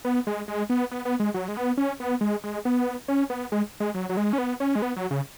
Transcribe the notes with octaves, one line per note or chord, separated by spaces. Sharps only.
B3
G#3
G#3
B3
B3
B3
G#3
F#3
G#3
B3
C#4
B3
G#3
G#3
B3
C#4
B3
G#3
G#3
F#3
F#3
G#3
C#4
B3
C#4
G#3
B3
F#3
C#3